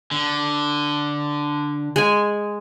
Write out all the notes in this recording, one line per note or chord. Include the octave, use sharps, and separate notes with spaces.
D3
G#3 G#5